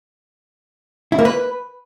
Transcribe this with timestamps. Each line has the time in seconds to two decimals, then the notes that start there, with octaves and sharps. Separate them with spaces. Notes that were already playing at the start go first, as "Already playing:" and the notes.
1.12 E4
1.19 A#3
1.25 B4